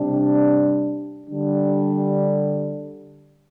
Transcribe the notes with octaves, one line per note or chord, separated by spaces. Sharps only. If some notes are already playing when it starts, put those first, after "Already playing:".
Already playing: C3 G3 D4
D3 G3 D4